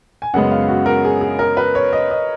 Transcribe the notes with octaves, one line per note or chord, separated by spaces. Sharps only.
G#5
F#2 C#3 G#3 B3 F#5
F5
F#4
A#4
G#4
G#4
A#4
B4
C#5
D#5
D#5